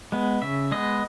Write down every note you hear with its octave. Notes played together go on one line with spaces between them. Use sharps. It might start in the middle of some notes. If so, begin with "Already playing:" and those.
G#3 B3
C#3 E5
G#3 B3 D#5